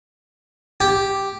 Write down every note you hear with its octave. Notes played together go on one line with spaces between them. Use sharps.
G4